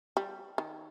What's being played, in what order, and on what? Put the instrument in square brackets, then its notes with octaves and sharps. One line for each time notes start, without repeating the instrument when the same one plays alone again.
[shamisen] G3
D#3